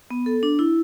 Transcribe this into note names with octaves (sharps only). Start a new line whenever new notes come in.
B3
A4
D4
E4